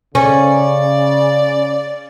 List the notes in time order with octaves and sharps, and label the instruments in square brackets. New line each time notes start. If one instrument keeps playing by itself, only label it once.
[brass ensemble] C#3 [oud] C#4 [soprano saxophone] D5